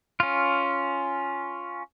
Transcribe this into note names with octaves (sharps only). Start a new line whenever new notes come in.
C#4 F4